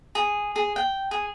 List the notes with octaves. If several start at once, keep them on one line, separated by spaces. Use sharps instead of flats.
G#4
G#4
G5
G#4